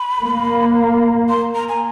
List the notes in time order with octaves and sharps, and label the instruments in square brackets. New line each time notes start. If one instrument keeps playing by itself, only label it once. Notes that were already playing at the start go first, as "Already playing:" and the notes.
Already playing: [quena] B5
[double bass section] A#3
[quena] C6
A#5
G#5